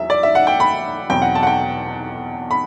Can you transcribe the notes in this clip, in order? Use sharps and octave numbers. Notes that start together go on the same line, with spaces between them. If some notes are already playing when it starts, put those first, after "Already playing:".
Already playing: E2 F#3 E5
D5
E5
F#5
G5
B5
E2 B2 F#3 C4 G5
F#5
A5
F#5
G5
B5